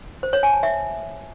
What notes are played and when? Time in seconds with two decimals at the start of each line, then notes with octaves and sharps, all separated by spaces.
0.23 C5
0.33 C#5
0.43 G#5
0.53 A5
0.63 E5